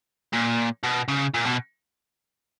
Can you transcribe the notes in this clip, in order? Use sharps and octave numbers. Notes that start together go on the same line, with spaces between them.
A#2
B2
C#3
A#2
B2